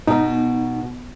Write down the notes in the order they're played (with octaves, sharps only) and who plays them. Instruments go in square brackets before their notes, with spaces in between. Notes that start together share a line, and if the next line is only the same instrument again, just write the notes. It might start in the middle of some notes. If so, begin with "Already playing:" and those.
[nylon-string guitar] B2 [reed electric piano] D#4